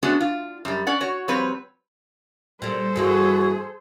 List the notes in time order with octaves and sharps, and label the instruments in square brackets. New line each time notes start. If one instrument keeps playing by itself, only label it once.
[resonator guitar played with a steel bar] G#3 A3 B3 C#4 D4 F#4
F4
F#2 G3
C#4 D5 F#5
F#4 C#5
F3 G3 C4 B4 C#5
[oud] A#2 G3 [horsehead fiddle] A4 C5
[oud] G2 E3 A#3 [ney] F#4 [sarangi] G#4